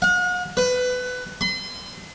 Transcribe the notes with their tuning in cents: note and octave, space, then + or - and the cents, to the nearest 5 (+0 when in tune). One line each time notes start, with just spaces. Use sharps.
F#5 -45
B4 +20
C6 -40